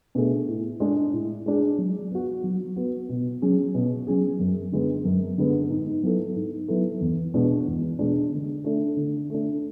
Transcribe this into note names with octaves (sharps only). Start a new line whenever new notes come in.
B2 A3 D4 G#4
A2
G#3 D4 G#4
A2
G#3 D4 G#4
F#3
B3 F#4
F#3
B3 F#4
B2
F#3 C#4 G#4
B2
F#3 C#4 G#4
F#2
D3 G#3 B3
F#2
D3 G#3 B3
G#2
F#3 B3 E4 A4
G#2
F#3 B3 E4 A4
E2
B2 G#3 D4
E2
B2 G#3 D4
D3
A3 D4
D3
A3 D4